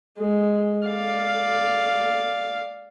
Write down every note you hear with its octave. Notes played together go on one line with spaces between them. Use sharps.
G#3
D5 F5